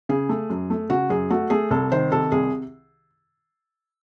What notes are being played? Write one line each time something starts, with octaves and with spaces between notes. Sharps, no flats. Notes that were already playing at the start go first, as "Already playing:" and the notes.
C#3 G#4
A3
F#2
A3
C#3 F#4
F#2 G#4
A3 F#4
A3 G#4
C2 A4
D#3 C5
C3 A4
C2 G#4